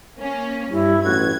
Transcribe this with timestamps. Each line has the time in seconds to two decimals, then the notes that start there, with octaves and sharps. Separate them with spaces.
0.19 A#3 C#4
0.71 G2 G3 E4
1.04 A1 F#4 G#6